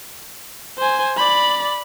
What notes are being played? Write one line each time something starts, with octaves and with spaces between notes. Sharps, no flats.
C5 G#5
D5 B5